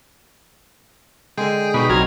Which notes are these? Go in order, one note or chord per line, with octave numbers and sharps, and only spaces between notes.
D3 G#3 G#4 G5
B2 D#4 F#4 B5
B1 F#3 C4 D#4 A#5 F6 G#6